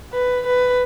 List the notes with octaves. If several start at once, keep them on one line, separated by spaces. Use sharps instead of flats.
B4
B4